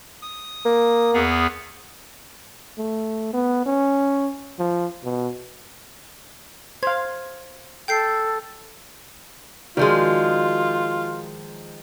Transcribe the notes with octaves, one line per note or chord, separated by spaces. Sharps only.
D#6
A#3
E2 B3 G#4
A3
B3
C#4
F3
B2
C5 F5 G#6
A4 G5 G6 C7
D#3 F3 G#3 F4 F#4 A#4 D5